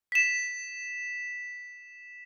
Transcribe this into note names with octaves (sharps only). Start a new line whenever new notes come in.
B6 E7